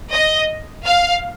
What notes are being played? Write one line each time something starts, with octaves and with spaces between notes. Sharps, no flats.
D#5
F5